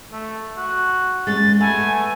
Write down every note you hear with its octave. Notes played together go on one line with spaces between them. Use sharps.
A3
F#4
G#3 A#3 C#4 A6
A3 B3 G#5